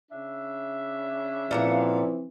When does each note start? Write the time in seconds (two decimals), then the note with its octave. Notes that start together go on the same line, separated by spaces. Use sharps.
0.12 C#3 D4 E5
1.51 A#2 E3 F3 C4 A4 F5 F#5